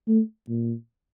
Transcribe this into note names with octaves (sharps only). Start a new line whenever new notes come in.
A3
A#2